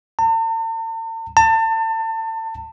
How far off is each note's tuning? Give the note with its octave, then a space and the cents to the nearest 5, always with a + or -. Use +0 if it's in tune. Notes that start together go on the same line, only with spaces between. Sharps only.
A5 +45
A5 +30